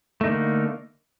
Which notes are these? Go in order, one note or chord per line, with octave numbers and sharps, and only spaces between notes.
D3 A3 A#3 D#4